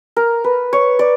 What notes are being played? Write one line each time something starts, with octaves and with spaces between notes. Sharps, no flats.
A#4
B4
C#5
D5